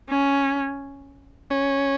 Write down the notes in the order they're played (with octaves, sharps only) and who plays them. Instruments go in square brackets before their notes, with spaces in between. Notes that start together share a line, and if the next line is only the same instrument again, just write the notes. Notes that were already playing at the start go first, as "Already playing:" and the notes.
[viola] C#4
[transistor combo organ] C#4